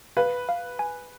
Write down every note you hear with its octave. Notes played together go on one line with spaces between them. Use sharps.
B4 F5
F5
G#5